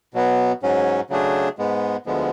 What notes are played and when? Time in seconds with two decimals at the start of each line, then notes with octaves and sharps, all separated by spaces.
0.14 B2 F#3 B3
0.63 G#2 F#3 C#4
1.10 C#3 F#3 A3 D4 G#4
1.58 G#2 G#3 B3
2.06 D2 D3 F3 G#3 B3